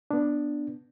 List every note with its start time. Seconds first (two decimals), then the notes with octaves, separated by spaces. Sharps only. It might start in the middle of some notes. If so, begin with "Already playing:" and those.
0.11 B3 D4